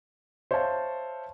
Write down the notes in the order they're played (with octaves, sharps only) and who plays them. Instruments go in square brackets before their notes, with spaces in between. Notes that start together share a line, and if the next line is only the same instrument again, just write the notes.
[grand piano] C5 C#5 E5 F5 A5